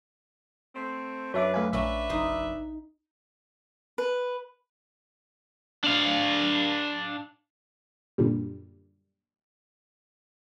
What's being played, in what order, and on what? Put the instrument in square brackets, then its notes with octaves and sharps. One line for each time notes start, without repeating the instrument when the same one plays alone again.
[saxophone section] A3 C4
[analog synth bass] F#2 [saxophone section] D4 A4 B4 [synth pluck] C#5 E5 D6
[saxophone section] D2 B4 [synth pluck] A3 F5 G#5
[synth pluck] A#1 [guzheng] C#4 D4 A#5 [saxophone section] B4 D5 E5
[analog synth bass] F#1 [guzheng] D#4 C6
[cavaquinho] B4
[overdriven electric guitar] D4 F5
[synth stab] F#2 A#2 D3 G3